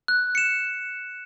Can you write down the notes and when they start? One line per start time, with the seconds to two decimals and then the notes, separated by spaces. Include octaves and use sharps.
0.08 F#6
0.35 C#7 E7